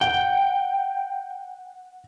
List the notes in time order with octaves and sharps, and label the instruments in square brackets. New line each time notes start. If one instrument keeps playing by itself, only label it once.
[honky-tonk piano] F#5 [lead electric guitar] G5